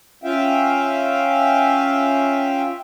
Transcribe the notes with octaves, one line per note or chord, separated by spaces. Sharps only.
C#4 F4 E5 F5 G5